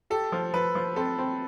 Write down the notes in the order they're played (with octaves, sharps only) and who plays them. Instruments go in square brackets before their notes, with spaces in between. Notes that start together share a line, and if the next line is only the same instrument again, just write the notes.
[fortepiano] G4 [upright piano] A4
[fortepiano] F3
[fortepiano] F3 [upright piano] B4
[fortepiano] F3
[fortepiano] C4 [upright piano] A4
[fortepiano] C4